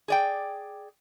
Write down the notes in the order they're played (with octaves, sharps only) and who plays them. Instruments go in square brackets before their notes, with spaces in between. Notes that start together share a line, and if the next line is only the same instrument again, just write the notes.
[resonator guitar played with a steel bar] G#4 D5 G5